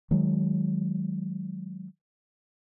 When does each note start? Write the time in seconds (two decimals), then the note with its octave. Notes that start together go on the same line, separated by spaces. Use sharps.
0.11 D#3 F#3 G#3